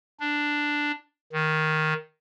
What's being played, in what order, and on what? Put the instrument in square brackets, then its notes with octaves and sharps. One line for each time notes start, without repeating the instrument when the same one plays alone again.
[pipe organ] D4
D#3